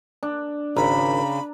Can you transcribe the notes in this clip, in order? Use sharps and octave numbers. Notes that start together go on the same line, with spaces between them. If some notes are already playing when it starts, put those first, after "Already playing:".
D4
G#1 C#3 A#5 B5